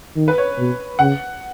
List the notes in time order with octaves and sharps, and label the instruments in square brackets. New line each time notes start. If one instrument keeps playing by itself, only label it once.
[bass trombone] D#3
[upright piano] B4
C#5
[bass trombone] B2
[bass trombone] C#3 [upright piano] F#5